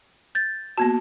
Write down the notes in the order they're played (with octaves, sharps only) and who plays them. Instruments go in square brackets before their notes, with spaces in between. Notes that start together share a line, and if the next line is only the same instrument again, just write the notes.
[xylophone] G6 A6
[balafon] A#3 B3 F#4 [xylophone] A5